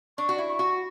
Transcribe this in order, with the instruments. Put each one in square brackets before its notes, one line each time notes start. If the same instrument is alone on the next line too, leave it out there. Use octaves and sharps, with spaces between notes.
[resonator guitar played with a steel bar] D4 [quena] C#6
[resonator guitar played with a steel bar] F#4
E4
[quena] C#6
[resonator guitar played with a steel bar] F#4